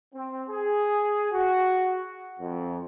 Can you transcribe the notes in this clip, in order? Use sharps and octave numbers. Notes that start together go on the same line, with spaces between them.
C4
G#4
F#4
F2